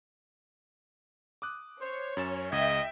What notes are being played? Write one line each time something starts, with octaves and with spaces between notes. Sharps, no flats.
D6 D#6 F#6
C5 C#5
F#2 C#4 A6 E7
C#2 D#5 E5 G5 G#6